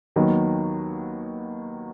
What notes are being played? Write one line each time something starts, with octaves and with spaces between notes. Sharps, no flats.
D#2 D#3 F#3 B3